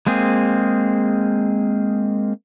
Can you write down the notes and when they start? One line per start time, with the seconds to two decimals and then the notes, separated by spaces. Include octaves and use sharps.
0.07 G#3 A#3 C4 G#4